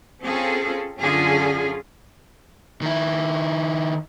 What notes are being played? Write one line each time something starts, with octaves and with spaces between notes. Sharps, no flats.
C4 C#4 F4 G#4 A4
F#2 D3 C#4 F4 G#4 A4
D#3 E4